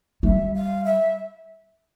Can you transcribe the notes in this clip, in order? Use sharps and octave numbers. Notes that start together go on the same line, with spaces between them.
G3 E5
F5
E5